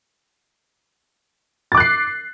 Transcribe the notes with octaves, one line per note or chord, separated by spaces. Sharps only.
D6 F#6 A6 C7